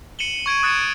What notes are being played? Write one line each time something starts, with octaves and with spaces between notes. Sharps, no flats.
C#7 D#7 E7 F#7 G7
C#6 G#6 D7 D#7
D#6 F#6 A6 C#7 D7 E7